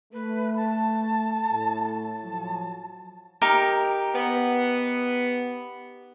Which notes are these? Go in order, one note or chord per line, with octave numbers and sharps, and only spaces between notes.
A3 B4
A5
A2
A5
F3 F#3
D#4 G4 A#4
B3